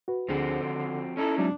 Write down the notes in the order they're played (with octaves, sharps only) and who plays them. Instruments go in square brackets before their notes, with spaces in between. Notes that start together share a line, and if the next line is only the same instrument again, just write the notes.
[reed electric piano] F#4 B4
[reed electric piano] D2 D4 G#4 [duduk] D3 [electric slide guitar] F3 C4 F#4
[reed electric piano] C5
[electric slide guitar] C#4 D#4 E4 [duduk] A4
[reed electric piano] F#3 G#3 C4 [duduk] D4